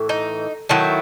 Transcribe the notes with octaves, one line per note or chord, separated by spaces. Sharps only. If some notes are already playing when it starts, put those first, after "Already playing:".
Already playing: A2 E3
D#4
D#3 F#3 A3 E4